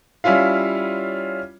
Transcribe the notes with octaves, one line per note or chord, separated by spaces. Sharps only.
G3 C#4 E4 F4 F5